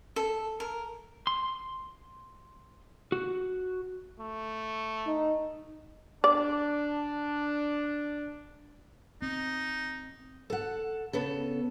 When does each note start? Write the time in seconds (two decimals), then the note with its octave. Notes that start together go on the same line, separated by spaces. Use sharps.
0.16 A4
0.60 A#4
1.27 C6
3.12 F#4
4.20 A3
5.07 D#4
6.24 D4 D5
9.22 C4 D#4
10.50 A4 F#5
11.13 C#3 B3 A4